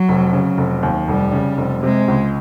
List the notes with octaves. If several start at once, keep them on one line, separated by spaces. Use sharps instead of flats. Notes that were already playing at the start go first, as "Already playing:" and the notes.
Already playing: F#3
F1
C#3
F1
D#2
F1 G3
C#3
F1
C3 G#3
C#2